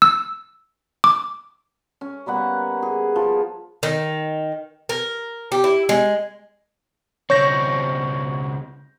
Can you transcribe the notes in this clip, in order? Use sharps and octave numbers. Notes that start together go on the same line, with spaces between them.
E6
D6
C#4
G3 A#3 B3 F#5
G#4
F3
D#3
A#4
G4
E4
G#3
C#2 C4 C#5 C#6 G6 A#6